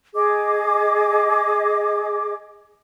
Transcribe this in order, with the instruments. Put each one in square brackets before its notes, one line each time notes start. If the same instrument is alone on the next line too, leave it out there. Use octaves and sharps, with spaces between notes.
[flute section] G#4 D#5 D6